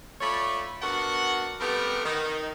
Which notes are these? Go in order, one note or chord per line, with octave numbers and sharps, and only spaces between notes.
A3 F4 C#5 D5 B5
B3 D4 F#4 A#4 F#5
G3 A3 B3 C4 G4 A#4
D#3 D#4